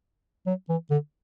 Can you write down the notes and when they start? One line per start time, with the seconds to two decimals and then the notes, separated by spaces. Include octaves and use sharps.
0.46 F#3
0.69 E3
0.90 D3